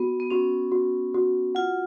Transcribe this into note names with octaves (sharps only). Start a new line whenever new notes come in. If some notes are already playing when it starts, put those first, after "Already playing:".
Already playing: B3 F#4
B3
C#4 F#4
F#4
F#4
F4 F#5